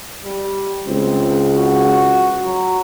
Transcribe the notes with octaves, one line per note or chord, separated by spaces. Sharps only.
G3
C#2 C4
F#4
F#3